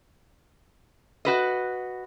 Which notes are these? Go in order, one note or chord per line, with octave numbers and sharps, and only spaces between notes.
F#4 B4 D#5